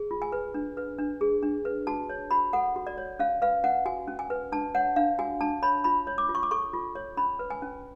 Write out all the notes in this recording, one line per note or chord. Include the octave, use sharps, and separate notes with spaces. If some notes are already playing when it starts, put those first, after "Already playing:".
Already playing: G#4
F4
G#5
B4
D4
B4
D4
G#4
D4
B4
F#4 A5
C#5
F#4 B5
A4 F#5
F#4
D5
C#5
C#4 F5
B4 F5
C#4 F#5
F#4 G#5
C#4
G#5
B4
D4 A5
C#5 F#5
D4 F5
F#4 G#5
D4 A5
C#5 B5
F4 B5
C#5
D6
F4
C#6
D6
A4 C#6
F4
C#5
C#4 B5
B4
G#5
C#4